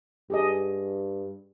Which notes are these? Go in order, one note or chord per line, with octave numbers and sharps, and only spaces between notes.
G2 G4 G#4 D#5